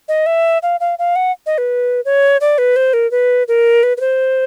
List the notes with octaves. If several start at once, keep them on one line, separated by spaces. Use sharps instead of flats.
D#5
E5
F5
F5
F5
F#5
D#5
B4
C#5
D5
B4
C5
A#4
B4
A#4
B4
B4
C5